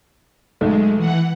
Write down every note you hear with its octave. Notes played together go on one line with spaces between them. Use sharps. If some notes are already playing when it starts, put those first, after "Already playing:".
B1 G#3 A3
E3 F#5